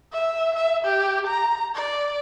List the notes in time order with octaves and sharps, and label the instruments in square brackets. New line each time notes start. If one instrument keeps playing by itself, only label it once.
[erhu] E5
E5
G4
A#5
D5